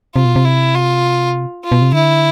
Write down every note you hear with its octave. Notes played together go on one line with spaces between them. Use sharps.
C3 F4
B2
C3
E4
F4
F4
B2
C3
D3 E4